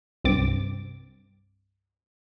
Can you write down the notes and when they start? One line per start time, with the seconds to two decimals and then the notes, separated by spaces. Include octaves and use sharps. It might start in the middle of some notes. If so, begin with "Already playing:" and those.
0.24 C2 G2 C4 D6 A6